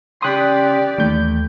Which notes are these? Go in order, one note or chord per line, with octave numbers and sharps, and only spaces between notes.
C#3 G4 D5 C6 D#6 F#6 B6
D#2 E3 A3 G6